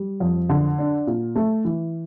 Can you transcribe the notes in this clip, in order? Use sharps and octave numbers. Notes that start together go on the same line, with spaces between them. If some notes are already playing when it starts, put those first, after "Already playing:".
Already playing: G3
F2
D3
D4
A#2
A3
E3